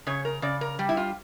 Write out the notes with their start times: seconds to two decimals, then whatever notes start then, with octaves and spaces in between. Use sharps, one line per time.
0.07 C#3 C#5
0.25 A#4
0.42 C#3 D5
0.61 A#4
0.79 G3
0.89 E4
0.97 F4